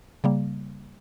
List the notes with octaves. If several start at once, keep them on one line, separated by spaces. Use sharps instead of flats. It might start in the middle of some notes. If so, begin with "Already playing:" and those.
C#3 G3 A#3